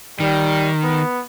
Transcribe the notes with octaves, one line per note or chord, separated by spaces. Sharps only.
D#3 G3
B3